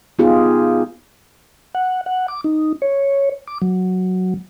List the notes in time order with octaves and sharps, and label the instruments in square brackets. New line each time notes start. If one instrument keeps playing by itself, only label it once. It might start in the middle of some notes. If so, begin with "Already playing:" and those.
[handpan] B3 D#4 F4 G4 G#4
[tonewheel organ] F#5
F#5
D6
D#4
C#5
D6
F#3